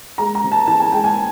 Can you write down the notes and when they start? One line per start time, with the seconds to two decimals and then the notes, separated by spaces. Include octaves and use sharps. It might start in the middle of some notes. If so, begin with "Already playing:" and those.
0.18 G#3 A#5
0.35 A#5
0.44 C3
0.52 A5
0.67 E3 A5
0.80 G#5
0.92 G#3 G5
1.04 G#5